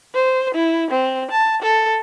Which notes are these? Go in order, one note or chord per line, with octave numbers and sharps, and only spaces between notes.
C5
E4
C4
A5
A4